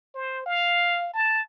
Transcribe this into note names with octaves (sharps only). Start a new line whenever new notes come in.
C5
F5
A5